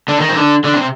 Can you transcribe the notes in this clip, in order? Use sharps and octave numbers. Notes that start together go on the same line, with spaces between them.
D3 D4
D#3 D#4
C4
D3 D4
D3 D4
C3 C4